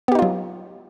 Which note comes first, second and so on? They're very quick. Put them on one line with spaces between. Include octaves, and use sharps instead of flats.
B3 G4 D#4 F4 F#3